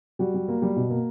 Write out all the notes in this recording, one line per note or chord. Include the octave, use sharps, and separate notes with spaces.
G3 F#4
G3
A#3
G3
B2
A#3